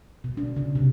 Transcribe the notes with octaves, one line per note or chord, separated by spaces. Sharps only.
B2
D4
C#3
C3